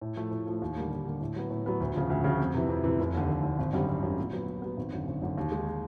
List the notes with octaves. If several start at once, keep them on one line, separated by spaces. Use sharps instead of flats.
A2
F3 A3
A2
F3 A3
D#2
D3 G3 A#3
D#2
D3 G3 A#3
A2
F#3 B3
A2
F#3 B3
D2
C#3 F3
D2
C#3 F3
F2
C3 E3
F2
C3 E3
F1
D#2 D3
F1
D#2 D3
G#1
F#2 D3 G3 C4
G#1
F#2 D3 G3 C4
A#2
F#3 B3
A#2
F#3 B3
G#1
F#2 D3
G#1
F#2 D3
D#2
D#3 G#3